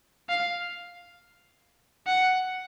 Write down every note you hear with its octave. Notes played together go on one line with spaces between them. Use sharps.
F5
F#5